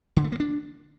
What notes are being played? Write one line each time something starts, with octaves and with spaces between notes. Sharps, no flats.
D3
A3
A#3
D4